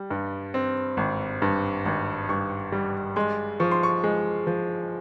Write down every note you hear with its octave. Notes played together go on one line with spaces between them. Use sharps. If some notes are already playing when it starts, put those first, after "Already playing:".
Already playing: G3
G2
C4
G#1
G2
G#1
G2 C#6
G3
G#3 C6
F3 C#6
C6
C#6
G#3
F3